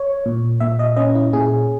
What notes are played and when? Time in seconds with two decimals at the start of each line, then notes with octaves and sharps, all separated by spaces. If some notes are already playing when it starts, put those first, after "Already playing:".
Already playing: C#5
0.26 A#2
0.60 A#2 E5
0.79 D#5
0.96 C#4 D#5
1.15 E4
1.33 A#2 G#4